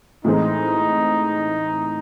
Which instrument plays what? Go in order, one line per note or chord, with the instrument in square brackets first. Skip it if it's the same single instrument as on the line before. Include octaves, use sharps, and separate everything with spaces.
[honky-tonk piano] A2 E3 G#3 C4 [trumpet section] D#4